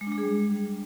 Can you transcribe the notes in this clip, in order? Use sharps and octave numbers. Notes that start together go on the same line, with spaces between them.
G#3
D4
G#3
G#4
G3